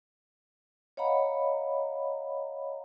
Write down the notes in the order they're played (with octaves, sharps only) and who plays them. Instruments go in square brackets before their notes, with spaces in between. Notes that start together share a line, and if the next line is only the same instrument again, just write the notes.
[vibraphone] C#5 D#5 F5 F#5 A#5 B5